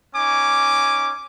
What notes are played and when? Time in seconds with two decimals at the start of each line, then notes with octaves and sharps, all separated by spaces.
0.16 C#4 D#4 G#5 D6